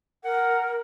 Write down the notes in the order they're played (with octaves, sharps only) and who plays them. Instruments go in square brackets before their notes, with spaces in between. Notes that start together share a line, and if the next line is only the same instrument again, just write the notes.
[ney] A#4 [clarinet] F#5